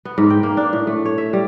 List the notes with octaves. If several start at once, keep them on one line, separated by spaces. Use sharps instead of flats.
B3
G#2
G5
A#3
D4
A2
A3
C#5
E5
G3